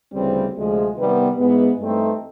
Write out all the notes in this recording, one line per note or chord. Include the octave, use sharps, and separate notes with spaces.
D2 C#3 E3 G3 C4
D2 C3 F3 G#3
C3 D#3 G3 B3
G#2 E3 G#3 B3
G2 E3 A3 C4 D#4